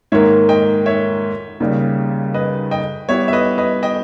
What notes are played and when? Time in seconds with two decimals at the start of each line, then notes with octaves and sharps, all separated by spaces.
0.12 G#2 D#3 A#3 C#5 E5
0.49 D#5 G5
0.86 C#5 E5
1.60 D#2 C#3 G3
2.34 B4 D#5
2.71 D#5 G5
3.09 G3 B3 E4 G4 C#5 E5
3.28 E5
3.33 B4 D#5
3.58 B4 D#5
3.83 D#5 G5